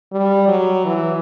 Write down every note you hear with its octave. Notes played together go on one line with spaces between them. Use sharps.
G3
F#3
E3